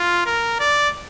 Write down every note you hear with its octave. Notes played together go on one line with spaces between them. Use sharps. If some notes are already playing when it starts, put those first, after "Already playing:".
Already playing: F4
A#4
D5